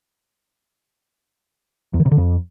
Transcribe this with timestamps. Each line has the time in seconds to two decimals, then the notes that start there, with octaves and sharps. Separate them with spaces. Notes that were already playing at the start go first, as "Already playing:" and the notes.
1.94 E2
2.00 D#3
2.06 C3
2.11 D3
2.17 F2